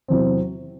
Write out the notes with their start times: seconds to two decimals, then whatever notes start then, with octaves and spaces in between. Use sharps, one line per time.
0.08 E2 C3 F#3 C4